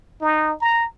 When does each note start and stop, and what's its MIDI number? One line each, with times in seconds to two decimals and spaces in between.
0.21 0.53 63
0.61 0.86 82